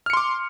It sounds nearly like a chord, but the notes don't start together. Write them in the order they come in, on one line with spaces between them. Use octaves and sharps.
F6 C#7 C6 D6